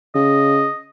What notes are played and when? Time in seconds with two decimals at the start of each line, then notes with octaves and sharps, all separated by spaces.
0.15 C#3 D#5